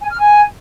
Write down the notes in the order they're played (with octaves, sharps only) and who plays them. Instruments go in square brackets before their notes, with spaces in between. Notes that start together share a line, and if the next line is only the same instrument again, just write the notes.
[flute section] G#5
F6
G#5